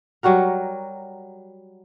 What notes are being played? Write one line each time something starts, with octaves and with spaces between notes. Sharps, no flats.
F#3 G3 F#4 A#4